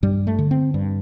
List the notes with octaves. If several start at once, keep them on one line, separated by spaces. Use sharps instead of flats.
G2 G3
A3
D3
C4
G2